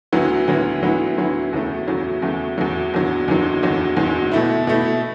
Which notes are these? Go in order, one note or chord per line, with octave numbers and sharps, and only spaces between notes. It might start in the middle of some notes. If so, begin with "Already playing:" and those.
D2 D3 F#3 B3 E4
D2 D3 F#3 B3 E4
D2 D3 F#3 B3 E4
D2 D3 F#3 B3 E4
E2 C#3 F#3 A3
E2 C#3 F#3 A3
E2 C#3 F#3 A3
E2 C#3 F#3 A3
F#1 E2 D3 F#3
F#1 E2 D3 F#3
F#1 E2 D3 F#3
F#1 E2 D3 F#3
B2 A3 E4
B2 A3 E4